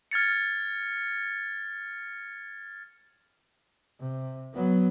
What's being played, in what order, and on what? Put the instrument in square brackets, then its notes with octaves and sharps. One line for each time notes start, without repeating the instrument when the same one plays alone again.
[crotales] F6 G#6 A6 C#7
[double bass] C3
F#3 B3